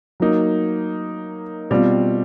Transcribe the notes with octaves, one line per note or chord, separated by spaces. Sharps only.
F#3 A#3 D#4
B2 G3 C4 F4